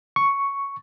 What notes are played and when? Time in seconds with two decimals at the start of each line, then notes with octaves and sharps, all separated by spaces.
0.16 C#6